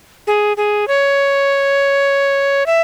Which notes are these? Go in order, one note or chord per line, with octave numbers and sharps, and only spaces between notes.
G#4
G#4
C#5
E5